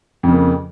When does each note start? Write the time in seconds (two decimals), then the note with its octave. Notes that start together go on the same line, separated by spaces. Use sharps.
0.23 F2
0.28 C#3
0.33 A#3